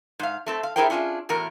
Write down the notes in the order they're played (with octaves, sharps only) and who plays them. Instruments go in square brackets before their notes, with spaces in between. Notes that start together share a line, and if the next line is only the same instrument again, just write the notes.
[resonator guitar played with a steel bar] G#2 F5
A3 C4 A4
F5
A3 E4 G#4 A#4 C5 G5
C#4 D4 F4 G#4 E5
E2 A2 F#4 A#4